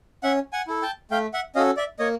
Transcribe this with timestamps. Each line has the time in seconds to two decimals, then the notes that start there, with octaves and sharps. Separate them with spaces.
0.23 C#4 E5 F#5
0.53 F#5 G#5
0.67 E4 A4
0.82 G5 A5
1.11 A3 F5 G5
1.34 E5 F#5
1.55 C#4 F#4 A4 D#5 F5
1.77 D5 E5
1.99 A#3 C#5 D#5